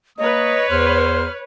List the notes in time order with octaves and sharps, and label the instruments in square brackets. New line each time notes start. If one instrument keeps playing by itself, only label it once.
[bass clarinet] A#3 [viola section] B4 C#5 [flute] D#5 [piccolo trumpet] D#6
[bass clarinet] E2 [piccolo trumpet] C5 [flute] F6